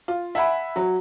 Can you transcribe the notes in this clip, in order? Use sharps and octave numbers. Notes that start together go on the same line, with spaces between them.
F4
E5 F#5 G#5 B5
F#3